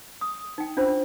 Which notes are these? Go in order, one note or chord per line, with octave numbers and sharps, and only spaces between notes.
D#6
D#4 G5
C#4 D4 F4 C5